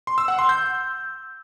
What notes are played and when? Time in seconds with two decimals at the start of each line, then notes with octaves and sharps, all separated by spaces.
0.07 C6
0.18 E6
0.28 F#5
0.39 C6
0.49 G6